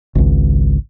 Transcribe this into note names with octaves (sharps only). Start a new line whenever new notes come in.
G#1 C#2